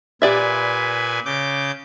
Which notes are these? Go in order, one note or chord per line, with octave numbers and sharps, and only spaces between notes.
A#2 G4 B4 D5 E5 G#5
C#3 D6 G6